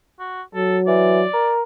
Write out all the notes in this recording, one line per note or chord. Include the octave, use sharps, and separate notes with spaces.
F#4
F#3 A4
E3 D5
A#4